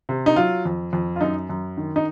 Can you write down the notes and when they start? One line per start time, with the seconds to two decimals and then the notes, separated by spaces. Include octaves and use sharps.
0.09 C3
0.26 D#4
0.36 F#3 F4
0.65 F2
0.93 F2
1.16 F4
1.21 F#2 D#4
1.50 F#2
1.78 D#3
1.96 D#4